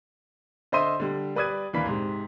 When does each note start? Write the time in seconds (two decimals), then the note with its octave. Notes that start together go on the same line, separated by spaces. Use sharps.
0.72 D3 C5 D#5 E5 C6 D#7
1.00 D3 G3
1.36 G3 B4 D5 D#6 G#6 D#7
1.73 D#2 E3 A#3 D4 B5 B6
1.86 G#2 C3